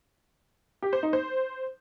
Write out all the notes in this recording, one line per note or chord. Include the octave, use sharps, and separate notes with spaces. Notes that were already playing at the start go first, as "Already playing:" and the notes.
G4
C5
D#4
C5